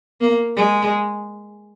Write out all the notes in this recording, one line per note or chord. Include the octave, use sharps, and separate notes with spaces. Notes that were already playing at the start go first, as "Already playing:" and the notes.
A#3
G#3